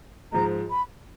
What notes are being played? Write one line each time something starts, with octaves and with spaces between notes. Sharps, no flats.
G#2 F3 G#3 A#5
B5